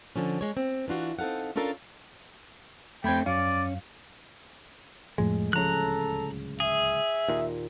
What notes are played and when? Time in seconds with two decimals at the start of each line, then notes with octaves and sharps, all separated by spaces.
0.16 D3 F3 C#4
0.41 G#3 C#5
0.57 C4
0.88 E3 D4 F4 F#4
1.19 C4 D#4 A4 F5 F#5
1.56 C#4 D4 F4 A4 A#4 F5
3.04 F2 A3 C4 G5 B5 G#6
3.26 F#2 F#3 C#4 D5 F5
5.18 F2 A2 F3 G#3
5.53 D1 C#2 C#3 F3 A4 A#5 F#6
6.60 G#4 E5
7.28 D#2 A#2